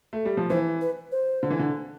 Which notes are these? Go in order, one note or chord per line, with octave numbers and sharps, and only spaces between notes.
A3
G3
F3
E3 C5
B4
C5
D3
E3
D3